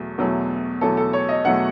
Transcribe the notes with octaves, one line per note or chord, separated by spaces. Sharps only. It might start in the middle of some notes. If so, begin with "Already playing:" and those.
Already playing: E2 B2 F#3 A3
E2 B2 F#3 A3
E2 B2 F#3 A3 A4
A4
C#5
D#5
E2 B2 F#3 A3 F#5